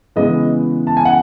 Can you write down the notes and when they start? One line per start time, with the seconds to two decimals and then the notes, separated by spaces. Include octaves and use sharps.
0.16 C#3 E3 G#3 B3 D#5
0.87 A5
0.97 G#5
1.05 F#5